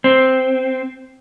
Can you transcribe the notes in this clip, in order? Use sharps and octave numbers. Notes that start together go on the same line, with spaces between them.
C4